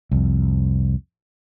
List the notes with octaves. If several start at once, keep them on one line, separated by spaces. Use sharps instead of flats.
C2 F2